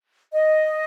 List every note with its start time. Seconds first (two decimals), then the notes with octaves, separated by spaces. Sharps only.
0.33 D#5